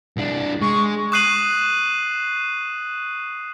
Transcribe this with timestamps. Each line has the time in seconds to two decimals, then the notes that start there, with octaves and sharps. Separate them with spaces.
0.17 C2 D4
0.62 G#3 C#6
1.12 C#6 D#6 F#6 C7 D#7 F#7